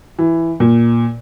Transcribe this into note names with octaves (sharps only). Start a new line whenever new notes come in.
E3
A#2